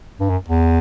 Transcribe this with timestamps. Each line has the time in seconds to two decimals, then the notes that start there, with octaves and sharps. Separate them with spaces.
0.20 G2
0.30 F#2
0.49 E2